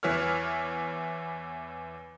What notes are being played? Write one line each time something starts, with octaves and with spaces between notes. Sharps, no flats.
E2 E4 B4 C#5 F6